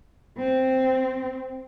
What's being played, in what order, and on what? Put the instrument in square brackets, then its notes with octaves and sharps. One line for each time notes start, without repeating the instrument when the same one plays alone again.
[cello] C4